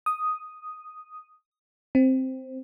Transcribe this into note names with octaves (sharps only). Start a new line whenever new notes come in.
D#6
C4